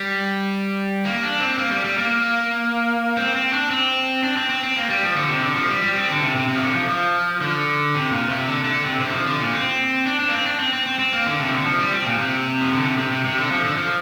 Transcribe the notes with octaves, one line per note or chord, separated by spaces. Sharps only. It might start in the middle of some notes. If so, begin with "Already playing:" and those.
Already playing: G3
A#3
D4
C4
A#3
G3
G3
A#3
C4
C4
D4
C4
D4
C4
C4
C4
A#3
G3
F3
D3
C3
D3
F3
G3
G3
C4
D3
C3
C3
C3
F3
D3
F3
F3
D3
C3
A#2
C3
D3
D3
C3
C3
D3
F3
D3
A#2
C4
D4
D4
A#3
C4
D4
C4
C4
C4
C4
A#3
D3
C3
F3
D3
F3
G3
C4
A#2
C3
F3
D3
C3
C3
C3
C3
D3
F3
D3
F3